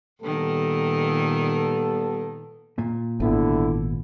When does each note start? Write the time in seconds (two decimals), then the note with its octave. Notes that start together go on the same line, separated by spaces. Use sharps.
0.23 A#2 D#3 G3 B3 A4
2.78 A#2
3.20 G#1 D3 B3 E4